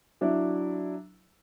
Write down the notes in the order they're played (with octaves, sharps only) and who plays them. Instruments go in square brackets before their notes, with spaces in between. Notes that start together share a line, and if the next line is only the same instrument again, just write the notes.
[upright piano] F#3 D4 E4